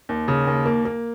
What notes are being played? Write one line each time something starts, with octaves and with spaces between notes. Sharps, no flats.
D#2
C#3
D#2
A#3
A#3